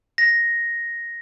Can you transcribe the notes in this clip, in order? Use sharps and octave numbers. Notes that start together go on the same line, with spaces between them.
A#6